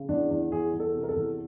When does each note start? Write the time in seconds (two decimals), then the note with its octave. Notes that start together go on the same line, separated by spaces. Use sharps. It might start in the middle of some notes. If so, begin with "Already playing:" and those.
Already playing: C#3
0.09 E2 D4
0.31 E2
0.51 E2 G#4
0.73 E2
0.80 A4
0.95 C3
1.03 A#4
1.09 A4
1.16 E2